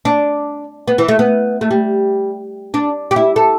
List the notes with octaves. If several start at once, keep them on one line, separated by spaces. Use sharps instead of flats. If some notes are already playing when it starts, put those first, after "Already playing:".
D4
B3
E3
A3
B3
A3
G3
D4
G4
E4
A4